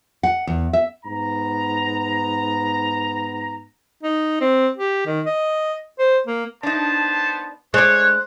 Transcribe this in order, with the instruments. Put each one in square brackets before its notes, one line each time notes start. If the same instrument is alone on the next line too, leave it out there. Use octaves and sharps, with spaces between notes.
[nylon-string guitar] F#5
E2
E5
[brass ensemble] G#2 B3 A#5
[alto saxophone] D#4
C4
G4
D#3
D#5
C5
A#3
[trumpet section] B3 C5 A5 [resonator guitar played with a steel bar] D4 D#4
[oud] G#3 D4 [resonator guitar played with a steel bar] C5 [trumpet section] C#5 [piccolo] F#6